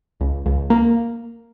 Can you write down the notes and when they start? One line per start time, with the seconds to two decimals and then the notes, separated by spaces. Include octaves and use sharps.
0.21 C#2
0.46 C#2
0.70 A#3